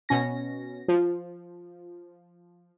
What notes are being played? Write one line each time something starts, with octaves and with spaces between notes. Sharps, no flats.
B2 C#4 A#6
F3